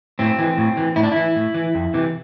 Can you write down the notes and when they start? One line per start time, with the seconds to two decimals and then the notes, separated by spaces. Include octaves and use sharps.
0.19 A2 C4
0.39 E3
0.57 A2
0.77 E3
0.96 A2 E4
1.03 D4
1.12 E3 E4
1.36 A2
1.55 E3
1.75 F2
1.94 C3 E3